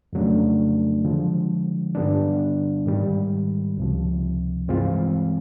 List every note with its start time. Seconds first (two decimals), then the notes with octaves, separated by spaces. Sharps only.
0.13 F2 C#3 F#3 A3 D4
1.05 D3 F3 G#3
1.95 G2 D3 G3 B3 D4
2.86 G#2 D#3 G3
3.78 C#2 C3 F3
4.68 G2 E3 G#3 C4 F4